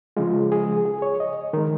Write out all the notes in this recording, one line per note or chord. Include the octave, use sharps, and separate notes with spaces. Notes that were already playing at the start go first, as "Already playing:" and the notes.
C#3 F3 G#3 F4
G#4
G#4
C#5
D#5
D#3 G#3 A#4